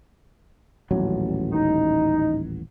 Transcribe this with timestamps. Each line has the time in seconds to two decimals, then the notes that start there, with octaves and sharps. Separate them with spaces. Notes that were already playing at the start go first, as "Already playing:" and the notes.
0.91 D#1 A1 F#3
1.52 D#4